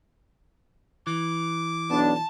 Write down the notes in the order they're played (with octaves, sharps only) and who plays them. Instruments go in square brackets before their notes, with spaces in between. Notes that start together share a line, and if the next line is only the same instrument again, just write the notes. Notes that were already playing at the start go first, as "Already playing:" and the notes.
[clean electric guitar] E3 [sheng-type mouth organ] D6
[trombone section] B1 B3 D4 [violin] A5